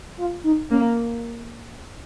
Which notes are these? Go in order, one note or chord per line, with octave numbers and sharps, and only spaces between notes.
F4
D#4
A#3 C#4